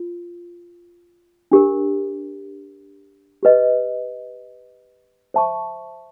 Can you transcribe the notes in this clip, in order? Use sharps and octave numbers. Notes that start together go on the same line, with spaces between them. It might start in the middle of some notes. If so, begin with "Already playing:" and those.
Already playing: F4
D4 G4 A#4
G4 B4 D#5
C5 E5 A5 C#6